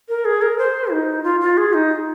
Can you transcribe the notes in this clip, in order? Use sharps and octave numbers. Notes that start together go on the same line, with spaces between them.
A#4
G#4
A#4
C5
D#4
F4
F4
G#4
D#4